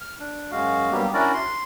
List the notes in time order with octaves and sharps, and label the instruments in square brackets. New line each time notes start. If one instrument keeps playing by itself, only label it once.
[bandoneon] F6
D4
F#2 G#3 F#4 F5
G2 F#3 G3 A#3 B3 G4
C#4 D4 E4 F#4 A#4 D5
C6